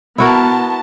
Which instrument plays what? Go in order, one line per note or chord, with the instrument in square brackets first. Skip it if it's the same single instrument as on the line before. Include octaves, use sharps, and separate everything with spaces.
[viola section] B3 A5 [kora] E4 F#4 A#4